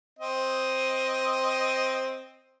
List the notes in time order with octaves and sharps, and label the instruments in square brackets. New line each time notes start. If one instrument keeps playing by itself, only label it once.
[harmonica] C4 D#5